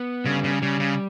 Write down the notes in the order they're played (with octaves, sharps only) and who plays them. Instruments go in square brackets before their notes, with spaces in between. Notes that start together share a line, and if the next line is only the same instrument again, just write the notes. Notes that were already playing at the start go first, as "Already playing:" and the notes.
Already playing: [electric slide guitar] B3
[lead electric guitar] C#3 [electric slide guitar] G3
[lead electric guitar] C#3
[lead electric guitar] C#3 [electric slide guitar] G3
[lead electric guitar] C#3